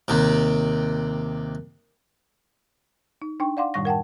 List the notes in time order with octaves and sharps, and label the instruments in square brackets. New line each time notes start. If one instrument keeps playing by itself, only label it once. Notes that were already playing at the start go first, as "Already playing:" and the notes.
[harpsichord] D#2 C3
[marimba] D#4
D4 D#4 G5 C#6
D5 F5 F#5 C6 D6
F#2 A2 D#3 G3 C#6 A#6
A#4 F#5 G5 A5